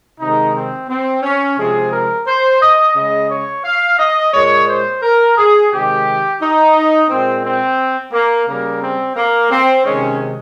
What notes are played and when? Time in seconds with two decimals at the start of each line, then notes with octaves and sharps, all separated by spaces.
0.20 C3 D#3 G#3 D#4
0.54 C4
0.89 C4
1.23 C#4
1.58 C3 F3 G#3 G#4
1.92 A#4
2.27 C5
2.61 D#5
2.96 C#3 G#3 D#5
3.30 C#5
3.65 F5
3.99 D#5
4.33 A#2 G#3 C#5
4.68 C5
5.03 A#4
5.37 G#4
5.71 C3 D#3 G#3 G4
6.41 D#4
7.09 A#2 G#3 C4
7.44 C4
8.13 A#3
8.47 C#3 G3 A#3
8.81 C4
9.17 A#3
9.51 C4
9.85 C3 D#3 G#3 C#4